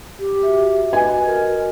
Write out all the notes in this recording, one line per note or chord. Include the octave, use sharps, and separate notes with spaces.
G4
F#4 E5
F#4 B4 D#5 G#5
A#4